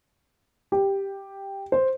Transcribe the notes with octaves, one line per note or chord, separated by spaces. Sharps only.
G4
C5